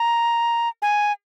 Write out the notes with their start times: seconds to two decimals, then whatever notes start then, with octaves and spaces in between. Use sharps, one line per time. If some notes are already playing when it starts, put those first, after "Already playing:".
Already playing: A#5
0.82 G#5